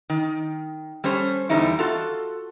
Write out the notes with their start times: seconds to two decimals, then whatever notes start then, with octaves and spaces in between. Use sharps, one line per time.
0.10 D#3
1.04 G3 C#4 A4 C5
1.49 E2 D3 G3 D#4 E4
1.79 F4 F#4 A4